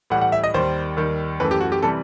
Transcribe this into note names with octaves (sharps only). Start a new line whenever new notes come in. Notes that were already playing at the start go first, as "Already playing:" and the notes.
A2 E3 G3 F#5
F#5
E5
D#5
D#2 D#3 G3 C5
D#2 D#3 G3
F#2 E3 A3 B4
G4
F#4
G4
C3 E3 G3 A4